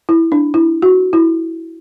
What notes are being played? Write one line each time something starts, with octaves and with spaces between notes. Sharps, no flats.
E4
D4
E4
F#4
E4